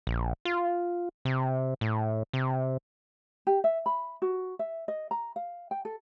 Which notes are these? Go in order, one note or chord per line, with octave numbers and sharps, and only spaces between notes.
A#1
F4
C3
A2
C3
G4
E5
B5
F#4
E5
D#5
A#5
F5
G5
A4